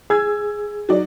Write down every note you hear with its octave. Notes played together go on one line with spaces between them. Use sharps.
G#4 E6 G#6
F#3 D#4 D5